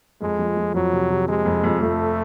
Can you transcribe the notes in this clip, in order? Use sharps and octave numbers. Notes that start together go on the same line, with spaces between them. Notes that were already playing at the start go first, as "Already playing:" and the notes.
F2 G#3
F3
F3
F2 F#3
C3
C3
C3 G#3
F2
F2
F2 A3